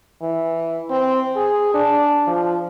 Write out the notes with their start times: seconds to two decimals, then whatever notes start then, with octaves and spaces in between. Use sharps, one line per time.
0.22 E3
0.90 C4
1.36 G#4
1.74 D4
2.27 F3